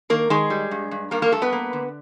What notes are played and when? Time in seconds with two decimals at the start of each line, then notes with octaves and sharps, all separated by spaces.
0.10 D#3 A#3 A#4
0.30 D#3 G#3 G#4
0.50 G3
0.71 G2
0.91 G2
1.11 G2 A#3 A#4
1.22 A#3 A#4
1.32 G2 A3 A4
1.42 B3 B4
1.52 A#3
1.73 D3